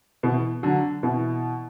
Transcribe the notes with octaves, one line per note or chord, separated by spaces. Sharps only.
B2 E3
D3 F#3
B2 E3